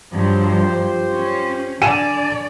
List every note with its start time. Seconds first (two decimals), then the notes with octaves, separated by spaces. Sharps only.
0.14 G2 F3 F#3 F4 G4 C5
1.16 C#4
1.82 D3 D5 G#5 D#7 E7